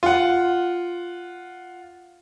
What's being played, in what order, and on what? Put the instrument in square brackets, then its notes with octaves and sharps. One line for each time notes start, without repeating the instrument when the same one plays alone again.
[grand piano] F4 F#5